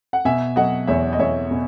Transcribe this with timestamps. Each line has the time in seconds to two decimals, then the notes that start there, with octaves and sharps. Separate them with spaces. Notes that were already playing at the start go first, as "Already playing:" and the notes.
0.13 F#5
0.25 B2 E5 G#5
0.56 F#3 D#5 F#5
0.87 E2 C#5 E5
1.13 D#5
1.19 E2 C#5 E5
1.51 B2